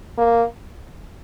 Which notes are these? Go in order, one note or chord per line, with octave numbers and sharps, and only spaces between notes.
A#3